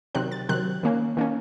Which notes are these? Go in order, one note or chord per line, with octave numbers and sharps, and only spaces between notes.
C3 D#3 F#3 C4 F#6
A6
C3 D#3 F#3 C4 F#6
D#3 A#3 C#4
D#3 A#3 C#4